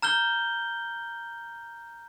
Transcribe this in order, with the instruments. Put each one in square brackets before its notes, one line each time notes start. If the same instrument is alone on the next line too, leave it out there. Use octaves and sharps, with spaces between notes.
[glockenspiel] A#5 F6 G6 G7